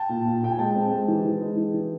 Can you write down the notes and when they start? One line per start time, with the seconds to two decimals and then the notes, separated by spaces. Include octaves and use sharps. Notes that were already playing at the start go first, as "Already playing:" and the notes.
Already playing: G5 A5
0.09 A#2
0.25 A#2
0.42 A#2 G5
0.51 G#5
0.58 G#3 G5 A5
0.75 C4
0.92 G#3
1.08 E3
1.24 E3
1.41 G#3
1.57 E3
1.74 E3